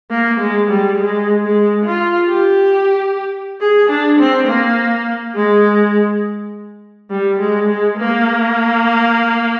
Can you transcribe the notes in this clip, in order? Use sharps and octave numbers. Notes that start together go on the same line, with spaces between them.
A#3
G#3
G3
G#3
G#3
F4
G4
G#4
D4
C4
A#3
G#3
G3
G#3
G#3
A#3